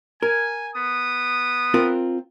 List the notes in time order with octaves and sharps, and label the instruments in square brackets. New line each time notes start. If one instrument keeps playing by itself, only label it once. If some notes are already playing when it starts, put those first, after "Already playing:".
[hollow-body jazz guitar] A#4 [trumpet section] G#5
[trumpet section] B3 D#6
[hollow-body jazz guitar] C4 F4 A#4